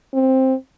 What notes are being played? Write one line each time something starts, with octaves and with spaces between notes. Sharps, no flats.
C4